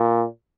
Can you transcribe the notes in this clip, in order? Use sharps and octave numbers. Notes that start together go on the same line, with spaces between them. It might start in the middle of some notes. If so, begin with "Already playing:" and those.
Already playing: A#2